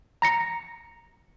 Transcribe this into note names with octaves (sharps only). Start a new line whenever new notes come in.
A#5 A#6 C#7